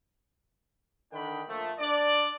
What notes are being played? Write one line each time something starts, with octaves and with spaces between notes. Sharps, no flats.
D3 D#3 D4 G5 B5
A#2 F3 A3
D4 D5